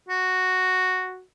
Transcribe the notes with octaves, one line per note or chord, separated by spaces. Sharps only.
F#4